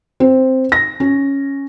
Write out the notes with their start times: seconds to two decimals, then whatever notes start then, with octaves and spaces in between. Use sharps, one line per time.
0.20 C4
0.72 A#6
1.00 C#4